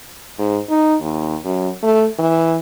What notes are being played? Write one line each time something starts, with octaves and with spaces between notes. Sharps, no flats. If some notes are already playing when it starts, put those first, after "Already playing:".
G#2
D#4
D#2
F#2
A3
E3